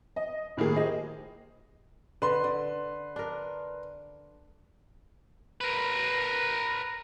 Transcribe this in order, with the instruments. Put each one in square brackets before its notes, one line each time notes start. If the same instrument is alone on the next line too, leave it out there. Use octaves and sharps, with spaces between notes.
[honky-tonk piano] D#5
A2 D#3 A#3 G#4
G4 G#4 C5 D#5
[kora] D3 [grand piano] B4 C6
[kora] D3
D4 A#4
[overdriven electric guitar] A#4 B4